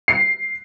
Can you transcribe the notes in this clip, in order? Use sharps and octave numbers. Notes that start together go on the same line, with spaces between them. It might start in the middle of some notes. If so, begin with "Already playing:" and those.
C7